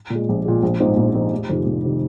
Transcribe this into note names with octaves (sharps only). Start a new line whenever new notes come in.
A#2
G#3
A#1
A#2 G#3
A#1
G#2 F3 C4 D#4
A#1
G#2 F3 C4 D#4
F1
F2 C3 D#3
F1
C3 D#3